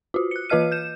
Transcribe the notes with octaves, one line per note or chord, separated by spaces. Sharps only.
F4 F#4
F#6 C#7
E3 F4 B4 D#5 F6 D#7
G6 E7